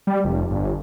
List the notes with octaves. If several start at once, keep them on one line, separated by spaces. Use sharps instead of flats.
G3
F1
G1